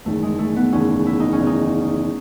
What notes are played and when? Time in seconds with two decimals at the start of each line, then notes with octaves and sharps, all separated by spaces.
0.05 F#1 E2 D#3 A3
0.23 G#3
0.39 A3
0.56 B3
0.72 F#1 E2 D#3 C#4
1.06 E4
1.20 D#4
1.32 C#4
1.40 F#1 E2 D#3
1.47 D#4